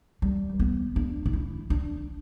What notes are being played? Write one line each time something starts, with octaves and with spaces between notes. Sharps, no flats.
G3
B3
D4
D4
E4
D4